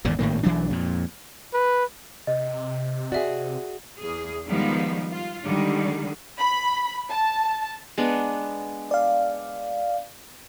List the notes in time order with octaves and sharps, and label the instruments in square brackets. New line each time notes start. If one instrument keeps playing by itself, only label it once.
[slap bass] G#1 E2 A#2 D3
G#1 A2 D#3 A#3
B1 E3 F#3 D4
F2 A#2
[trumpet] B4
[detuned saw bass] C3 [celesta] D#5
[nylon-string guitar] F#4 G#4 [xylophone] D5 E5
[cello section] E2 G#4
D#3 F3 G3 G#3 B3
F4
D3 D#3 G3 G#3
[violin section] B5
A5
[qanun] G#3 B3 D4
[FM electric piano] D5 F5